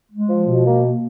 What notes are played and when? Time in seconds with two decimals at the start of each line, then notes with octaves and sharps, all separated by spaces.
0.12 G#3
0.29 F3
0.47 B2
0.66 A#3
0.85 A#3